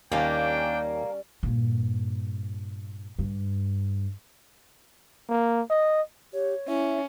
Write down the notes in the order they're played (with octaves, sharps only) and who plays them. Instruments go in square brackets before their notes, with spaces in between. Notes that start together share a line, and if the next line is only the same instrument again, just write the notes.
[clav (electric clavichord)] D#2 [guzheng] G3 C#4 [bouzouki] A#3 [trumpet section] D4 G5
[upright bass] G2 A#2
G2
[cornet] A#3
D#5
[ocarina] G4 [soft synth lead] C#5
[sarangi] C#4 [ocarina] E4 [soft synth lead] E5